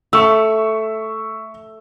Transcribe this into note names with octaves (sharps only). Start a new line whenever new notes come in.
A3 E5 C#6 E6